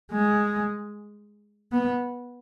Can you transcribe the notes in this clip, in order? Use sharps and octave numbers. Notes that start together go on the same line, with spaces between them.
G#3
B3